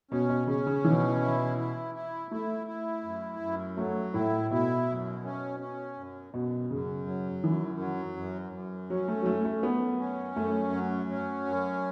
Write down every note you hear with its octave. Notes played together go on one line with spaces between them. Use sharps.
B2 C#4
B2
C#3 C#4
C#3
B2 E3
E4
E4
E4
A3 E4
E4
F#2
F#2
F#3 A3
A2 E4
B2 E4
F#2
C#4
C#4
F#2
F#2 B2
F#2 C#3
F#3
F#2 E3
F#3
F#2
F#2
F#3 C#4
A3
F#3
F#2 A3
A3
F#2 B3
C#4
F#2 A3
F#3
C#4
F#2